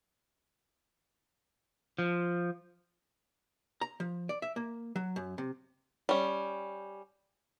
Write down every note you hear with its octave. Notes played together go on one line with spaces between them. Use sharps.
F3
A#5
F3
D5
E5
A#3
F#3
F#2
C3
G3 C#4